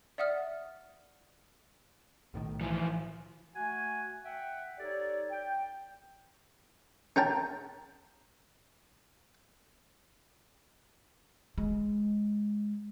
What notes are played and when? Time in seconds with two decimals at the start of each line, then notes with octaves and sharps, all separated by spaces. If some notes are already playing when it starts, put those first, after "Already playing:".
0.18 D5 E5 F#5 D#6 F6
2.34 B1 A2 D#3
2.61 E3 F3
3.55 A3 F#4 F#5 G#5
4.24 E5 F#5 G5
4.79 D#4 G4 A4 C#5 D5
5.31 G5
7.16 C#4 A#4 G5 A5
11.58 G#3